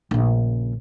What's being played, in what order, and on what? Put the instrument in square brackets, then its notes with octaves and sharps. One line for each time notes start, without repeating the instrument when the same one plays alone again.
[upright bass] A#1 C#3